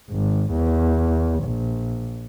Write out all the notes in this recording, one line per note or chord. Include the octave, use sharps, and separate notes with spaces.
G#1
E2
A#1